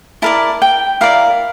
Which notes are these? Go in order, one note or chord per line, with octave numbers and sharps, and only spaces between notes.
E4 A#4 D5 A5
G5
E4 A#4 D5 F5